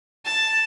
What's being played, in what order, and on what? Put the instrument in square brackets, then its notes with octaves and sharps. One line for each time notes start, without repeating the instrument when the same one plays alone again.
[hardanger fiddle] A5